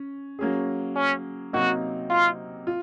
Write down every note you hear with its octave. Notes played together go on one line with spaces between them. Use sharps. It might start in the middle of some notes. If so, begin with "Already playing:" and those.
Already playing: C#4
F#3 A#3 C#4 G#4
C#4
C3 F#3 A#3 D#4 F#4
F4
F4